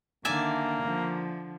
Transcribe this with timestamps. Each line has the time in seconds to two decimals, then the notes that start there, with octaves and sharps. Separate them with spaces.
0.25 D3 D#3 A#3 D5 E5 G#5
0.83 D3 F3